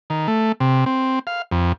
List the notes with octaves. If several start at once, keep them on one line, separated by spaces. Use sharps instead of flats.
D#3
A3
C3
C4
F5
F2